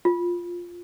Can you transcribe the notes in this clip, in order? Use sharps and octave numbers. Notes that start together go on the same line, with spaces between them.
F4